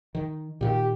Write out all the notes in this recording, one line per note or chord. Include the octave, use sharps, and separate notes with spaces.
D#3
A#2 D#3 G4